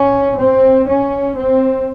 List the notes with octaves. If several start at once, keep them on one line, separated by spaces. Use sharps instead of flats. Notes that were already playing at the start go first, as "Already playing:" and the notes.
Already playing: C#4
C4
C#4
C4